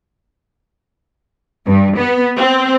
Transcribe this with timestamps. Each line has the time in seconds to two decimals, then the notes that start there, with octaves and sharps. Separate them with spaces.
1.66 G2
1.98 B3
2.39 C4